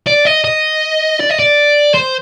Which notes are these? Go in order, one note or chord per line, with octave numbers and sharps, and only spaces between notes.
D5
D#5
D#5
D5
D#5
D5
C5